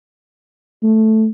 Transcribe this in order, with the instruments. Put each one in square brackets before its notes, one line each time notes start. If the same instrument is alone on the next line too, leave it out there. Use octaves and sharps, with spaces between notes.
[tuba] A3